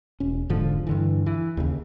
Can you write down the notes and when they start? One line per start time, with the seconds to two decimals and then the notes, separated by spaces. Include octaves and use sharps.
0.20 E1 C#4
0.49 E1 G#2 D3 F3
0.87 G2 D3 E3
1.26 E3
1.57 D#2 C#3